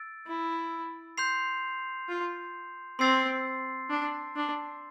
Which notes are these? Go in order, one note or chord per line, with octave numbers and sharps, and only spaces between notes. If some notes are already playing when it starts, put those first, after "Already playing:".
Already playing: E6 A6 D7
E4
C6 G6 C7 F7
F4
C4 C6 E6 A6 C7
D4
D4